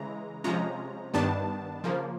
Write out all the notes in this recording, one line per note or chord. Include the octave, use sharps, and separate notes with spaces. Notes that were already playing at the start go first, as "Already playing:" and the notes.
Already playing: C#3 E3 G#3 A#5
C3 F3 G#3 C#4 A#5
G2 D#3 G3 B3 D4 A5
C#3 F3 A#3